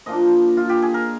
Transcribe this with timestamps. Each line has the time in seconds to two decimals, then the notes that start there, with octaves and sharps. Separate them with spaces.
0.06 A#2 F3 A#3 D4 D#5
0.57 F4
0.69 G4
0.82 G#4
0.94 A#4